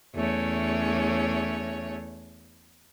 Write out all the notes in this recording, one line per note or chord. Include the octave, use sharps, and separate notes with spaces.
E2 A3 C#4 C#5